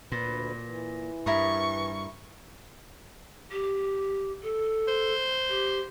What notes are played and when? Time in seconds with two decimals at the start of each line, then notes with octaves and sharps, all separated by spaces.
0.12 D2 A#2 B4 C5
0.64 E3
1.26 G2 E4 A#4 C#6 D#6
3.52 G4
4.43 A4
4.88 C5
5.49 G4